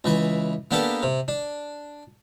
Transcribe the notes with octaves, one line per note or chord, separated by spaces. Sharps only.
C#2 E3 B4
A#3 B3 D4 G4 A4 B4
C3
D4